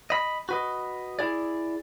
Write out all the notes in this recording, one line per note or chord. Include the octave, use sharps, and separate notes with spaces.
D#5 B5
F#4 B4 D#5
E4 G#4 D5